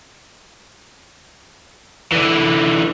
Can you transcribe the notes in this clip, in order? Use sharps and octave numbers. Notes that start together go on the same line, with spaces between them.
D3 E3